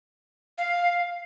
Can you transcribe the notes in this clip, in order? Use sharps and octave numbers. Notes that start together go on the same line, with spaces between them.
F5